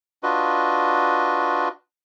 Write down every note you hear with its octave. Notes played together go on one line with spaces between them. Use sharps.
D4 F4 F#4 B4 D#5